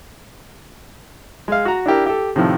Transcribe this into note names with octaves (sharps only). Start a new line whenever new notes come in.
G#3 F5
F#4 A#5
D4 E4 G4 A#4
G4 A4
A2 C3 D#3 F3